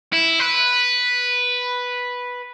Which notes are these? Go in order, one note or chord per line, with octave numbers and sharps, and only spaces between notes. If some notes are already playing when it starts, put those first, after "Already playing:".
E4
B4